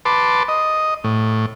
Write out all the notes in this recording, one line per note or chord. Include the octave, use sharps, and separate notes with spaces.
B4 A5 C6 D6
D#5
A2